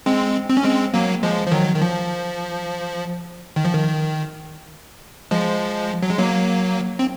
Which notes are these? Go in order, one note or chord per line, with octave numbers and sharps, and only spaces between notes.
G#3 C4
C4
C#4
G#3 C4
F#3 A#3
F3 G#3
F3
D#3 F#3
D#3
F3
D#3
F3
D#3
F3 G#3
F#3
G#3
F#3 A#3
C4